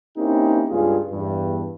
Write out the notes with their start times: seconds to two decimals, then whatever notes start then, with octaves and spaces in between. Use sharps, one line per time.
0.17 A#3 C4 C#4 D#4 E4 G4
0.69 C#2 G2 F4 G#4
1.11 E2 G2